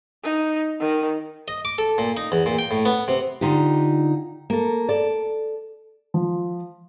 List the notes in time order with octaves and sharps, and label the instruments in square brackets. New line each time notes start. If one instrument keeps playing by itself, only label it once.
[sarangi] D#4
D#3
[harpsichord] D#5
D6
A4
A#2
D#4
E2
A#2
G5
A2
B3
C3
[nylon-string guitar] D3 D#4 F4 G4
A#3 A4
A4 D5
[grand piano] F3